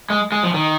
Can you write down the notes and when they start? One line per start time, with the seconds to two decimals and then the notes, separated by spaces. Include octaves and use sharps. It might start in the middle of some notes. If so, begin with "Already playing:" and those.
0.10 G#3
0.32 G#3
0.43 F3
0.54 D#3